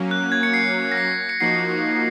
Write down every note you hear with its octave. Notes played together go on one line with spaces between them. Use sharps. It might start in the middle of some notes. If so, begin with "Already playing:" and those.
Already playing: F#3 A#3 C#4
F#6
G#6
C#7
C7
A#6
C7
C#7
F3 A#3 D#4 F#4 C7